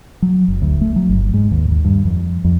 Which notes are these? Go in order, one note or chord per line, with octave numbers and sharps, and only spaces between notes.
F#3
F#1
D2
A3
F#3
G1
G#2
D#2
D#2
G2
F2
F2